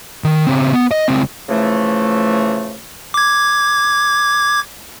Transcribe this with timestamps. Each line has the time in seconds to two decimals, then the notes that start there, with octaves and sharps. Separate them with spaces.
0.24 D#3
0.47 C#3 C4
0.73 B3
0.91 D#5
1.08 C#2 C4
1.49 C#3 E3 F3 A3
3.14 D6 G#6